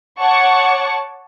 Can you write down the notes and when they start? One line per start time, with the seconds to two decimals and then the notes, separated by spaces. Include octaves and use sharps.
0.21 C#5 F#5 A5 C#6 D6